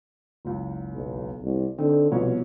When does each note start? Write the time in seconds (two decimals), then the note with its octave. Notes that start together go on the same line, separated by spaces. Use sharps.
0.45 F#1 C#2
0.94 B1
1.43 C2
1.78 D3 C4 D#4 G5
2.12 C2 B2 F3 C#5